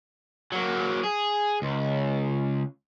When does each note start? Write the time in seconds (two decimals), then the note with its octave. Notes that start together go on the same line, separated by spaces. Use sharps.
0.52 F#3 A#3
1.03 G#4
1.62 C#2